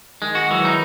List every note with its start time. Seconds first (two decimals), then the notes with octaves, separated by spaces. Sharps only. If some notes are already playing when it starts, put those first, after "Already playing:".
0.21 D#3 G#3
0.35 F#4
0.50 E3 F#3
0.65 D#4